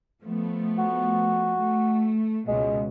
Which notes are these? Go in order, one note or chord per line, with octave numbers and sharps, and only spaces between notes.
F3 A3 B3
F#4
A3
C#2 B2 G#3